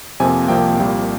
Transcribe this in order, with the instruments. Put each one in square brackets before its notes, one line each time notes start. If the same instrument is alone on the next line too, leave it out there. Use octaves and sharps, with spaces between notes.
[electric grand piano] F2 C3 F3 A#3 G#5
C2 C3 F3 A#3 G5
C2 A#2 G3 A#3